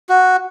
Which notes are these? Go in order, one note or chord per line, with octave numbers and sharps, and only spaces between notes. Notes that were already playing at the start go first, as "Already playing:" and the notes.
F#4